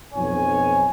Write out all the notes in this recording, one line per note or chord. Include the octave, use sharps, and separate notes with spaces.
B1 F2 C#5 G#5